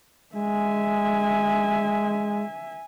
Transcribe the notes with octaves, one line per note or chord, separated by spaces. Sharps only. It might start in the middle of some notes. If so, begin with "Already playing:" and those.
G#3 E5 G#5